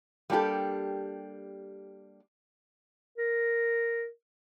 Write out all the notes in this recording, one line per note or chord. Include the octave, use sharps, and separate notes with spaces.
G3 A#3 D4 F#4 G4 A4
A#4